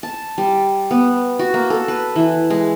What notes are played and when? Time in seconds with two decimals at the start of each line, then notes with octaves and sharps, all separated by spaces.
0.03 A5
0.38 G3
0.91 B3
1.39 F#4
1.54 A#3
1.70 A4
1.88 B4
2.16 E3
2.50 G#3